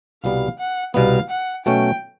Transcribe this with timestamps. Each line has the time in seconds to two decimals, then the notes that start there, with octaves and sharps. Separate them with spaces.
0.23 C2 B2 G3 B3 F5
0.59 F#5
0.94 C2 B2 G3 B3 F5
1.30 F#5
1.65 B2 F#3 A3 C#4 G5